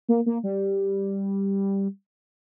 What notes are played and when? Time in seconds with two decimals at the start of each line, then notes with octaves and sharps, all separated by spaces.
0.09 A#3
0.26 A#3
0.43 G3